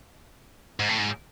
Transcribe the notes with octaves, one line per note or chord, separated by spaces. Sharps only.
G#2
A2
G#2